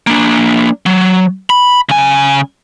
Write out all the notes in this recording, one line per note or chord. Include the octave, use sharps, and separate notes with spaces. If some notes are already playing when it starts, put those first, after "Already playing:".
A#3 D4
F#3
B5
C#3 G#5